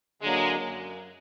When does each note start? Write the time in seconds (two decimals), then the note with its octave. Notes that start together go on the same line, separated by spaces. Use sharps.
0.22 D3 F#3 G#3 A#3
0.64 F#2